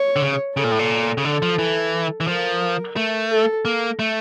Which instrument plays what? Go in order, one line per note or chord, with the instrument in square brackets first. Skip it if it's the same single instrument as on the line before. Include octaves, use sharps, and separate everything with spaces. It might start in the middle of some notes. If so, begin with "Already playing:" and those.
Already playing: [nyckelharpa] C#5
[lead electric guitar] D3
C#3
[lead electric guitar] C#3 [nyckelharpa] A4
[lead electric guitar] A#2
A2
A#2
C#3
[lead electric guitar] D3 [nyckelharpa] A4
[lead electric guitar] F3
E3
E3
[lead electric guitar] F3 [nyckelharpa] A#4
[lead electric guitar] A3
[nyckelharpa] A4
[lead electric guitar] A#3
A3